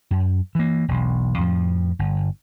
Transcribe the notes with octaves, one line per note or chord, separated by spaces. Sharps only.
F#2
E3 A#3
E1 B1
F2 A2 F3
G1